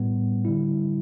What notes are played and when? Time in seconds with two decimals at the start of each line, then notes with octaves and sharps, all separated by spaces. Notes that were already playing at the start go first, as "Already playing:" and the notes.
Already playing: A2 G3 B3
0.45 D3 G3 E4